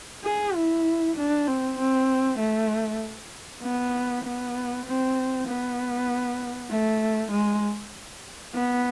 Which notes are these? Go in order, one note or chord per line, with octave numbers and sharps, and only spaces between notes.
G#4
E4
D4
C4
C4
A3
B3
B3
C4
B3
A3
G#3
B3